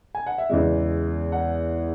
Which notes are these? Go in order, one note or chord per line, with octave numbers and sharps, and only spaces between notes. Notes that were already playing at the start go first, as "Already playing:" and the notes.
G#5
F#5
E5
E2 C#3 E3 G#3 D#5
F#5